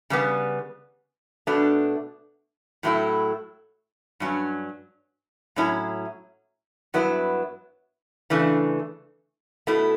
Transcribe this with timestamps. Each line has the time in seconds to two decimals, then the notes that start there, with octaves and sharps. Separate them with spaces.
0.10 C#3 G3 B3
1.47 B2 A3 D4
2.83 A2 F#3 A3 E4
4.20 G2 F#3 C#4
5.56 A2 F#3 C#4 E4
6.94 G2 F#3 B3 E4
8.30 C#3 E3 A3 D4
9.67 B2 A3 E4